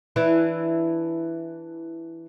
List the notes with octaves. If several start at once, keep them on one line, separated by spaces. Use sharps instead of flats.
E3 D4 E4